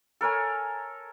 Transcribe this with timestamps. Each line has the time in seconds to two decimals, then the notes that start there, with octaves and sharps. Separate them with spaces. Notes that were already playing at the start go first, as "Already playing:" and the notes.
0.21 A4 A#4 C#5 G#5